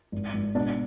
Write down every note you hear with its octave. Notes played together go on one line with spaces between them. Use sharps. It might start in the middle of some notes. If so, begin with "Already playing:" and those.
G#1
G#1
B2 D4